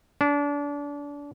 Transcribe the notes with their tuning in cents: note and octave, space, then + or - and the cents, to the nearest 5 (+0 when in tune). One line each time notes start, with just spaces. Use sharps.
D4 -30